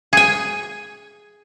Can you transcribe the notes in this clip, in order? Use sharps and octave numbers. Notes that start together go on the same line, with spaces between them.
G#4 G#5